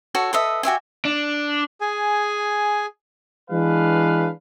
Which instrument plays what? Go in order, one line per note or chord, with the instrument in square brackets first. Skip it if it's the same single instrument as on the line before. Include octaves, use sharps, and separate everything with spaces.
[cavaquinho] F#4 A4 C#5
A4 B4 D#5 E5
F#4 G4 E5 G#5
[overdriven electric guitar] D4
[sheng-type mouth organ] G#4 G#5
[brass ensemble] E3 G#3 D4 B4 F5